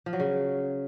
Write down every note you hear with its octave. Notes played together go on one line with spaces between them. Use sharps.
F3
F#3
C#3